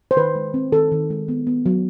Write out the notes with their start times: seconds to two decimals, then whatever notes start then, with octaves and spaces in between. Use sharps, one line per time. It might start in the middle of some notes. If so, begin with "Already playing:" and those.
0.11 C5
0.16 D#3 B4
0.35 G#3
0.54 C4
0.72 D#3 A4
0.91 D#3
1.10 G#3
1.28 B3
1.47 B3
1.66 F#3